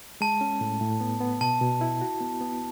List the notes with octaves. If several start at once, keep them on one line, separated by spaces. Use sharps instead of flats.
G#3 A5
C#4
A2
A2
B3
B3
B2 A5
B2
E4
F#4
B3
B3